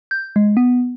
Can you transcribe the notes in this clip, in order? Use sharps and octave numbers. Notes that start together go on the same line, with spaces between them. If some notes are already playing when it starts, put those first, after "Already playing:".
G6
G#3
B3